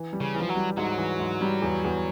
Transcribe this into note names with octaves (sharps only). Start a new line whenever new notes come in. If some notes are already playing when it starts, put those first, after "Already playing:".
Already playing: E3
G3
C#3
E3
F3
F#3
G3
G#2 F#3
E3
G#2
G3
E2
E2